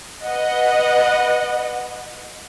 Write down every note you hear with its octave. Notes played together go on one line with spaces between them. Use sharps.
B4 D#5 F#5